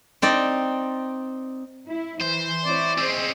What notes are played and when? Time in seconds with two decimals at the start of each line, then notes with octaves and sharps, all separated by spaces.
0.22 C4 D#4 D5
1.88 E4
2.21 E3 C5
2.65 C4 E4 C#5 D5
2.98 C4 C#4 G#4 C5 D#5